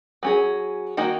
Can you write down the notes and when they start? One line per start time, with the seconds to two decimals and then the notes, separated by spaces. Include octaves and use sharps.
0.23 F#3 C#4 G#4
0.97 D#3 A#3 D#4 F#4